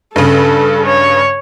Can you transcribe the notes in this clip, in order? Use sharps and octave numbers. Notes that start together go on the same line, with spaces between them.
G2 C#3 A4
C#5